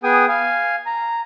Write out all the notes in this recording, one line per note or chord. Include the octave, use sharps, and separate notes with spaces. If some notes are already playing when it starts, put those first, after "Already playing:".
B3 G#4 G5 G#5 D#6
F5 G#5
A#5